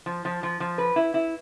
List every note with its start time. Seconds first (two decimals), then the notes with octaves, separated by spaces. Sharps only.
0.06 F3
0.25 F3
0.43 F3
0.60 F3
0.78 B4
0.96 E4
1.14 E4